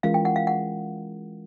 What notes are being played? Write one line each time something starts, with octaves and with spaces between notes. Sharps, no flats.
E3 G#3 C#4 F4 A#4 F5
G5
F#5
F5
F#5